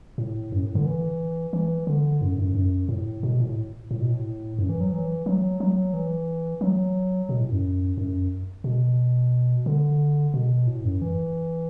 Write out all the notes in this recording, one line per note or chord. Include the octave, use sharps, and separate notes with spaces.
A2
F#2
A2
D3
E3
E3
D3
F#2
F#2
F#2
A2
B2
A2
A2
B2
A2
F#2
E3
F#3
E3
F#3
F#3
E3
F#3
B2
A2
F#2
F#2
B2
D3
B2
A2
F#2
E3